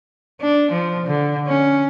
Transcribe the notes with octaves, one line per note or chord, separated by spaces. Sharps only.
D4
F3
D3
C#4